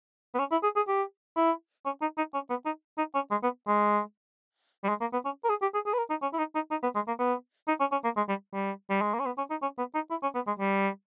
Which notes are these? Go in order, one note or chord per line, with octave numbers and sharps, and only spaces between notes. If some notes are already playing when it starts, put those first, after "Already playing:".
B3
C#4
E4
G#4
G#4
G4
E4
C#4
D#4
D#4
C#4
B3
D#4
D#4
C#4
G#3
B3
G#3
G3
G#3
A#3
B3
C#4
A#4
G#4
G4
G#4
G#4
B4
A#4
D#4
C#4
E4
D#4
D#4
D#4
B3
G#3
A#3
B3
D#4
C#4
C#4
A#3
G#3
G3
G3
G3
G#3
A#3
C#4
B3
C#4
D#4
C#4
B3
D#4
E4
C#4
B3
G#3
G3